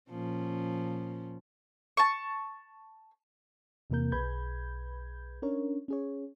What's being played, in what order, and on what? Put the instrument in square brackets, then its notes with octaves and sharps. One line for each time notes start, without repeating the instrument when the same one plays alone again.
[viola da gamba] A#2 F3 C#4
[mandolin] A5 C#6
[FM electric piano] E2 C3 E3 A#3 A#4 G6
B1 G#4 B4 B5 G6 G#6
C#4 D4 A#4 C#5
C#4 G#4 C#5